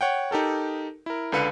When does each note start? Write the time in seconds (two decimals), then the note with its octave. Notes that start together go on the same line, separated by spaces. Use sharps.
0.01 C#5 F#5 G5
0.31 D#4 G4 A4 A#4
1.06 E4 A#4
1.32 C#2 D3 B4 F5 C#7 D#7